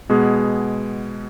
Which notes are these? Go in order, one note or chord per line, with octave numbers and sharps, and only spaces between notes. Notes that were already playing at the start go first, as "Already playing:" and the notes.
B2 G#3 B3 G#4